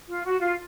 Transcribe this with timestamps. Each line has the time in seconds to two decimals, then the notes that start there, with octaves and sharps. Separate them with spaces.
0.09 F4
0.24 F#4
0.40 F4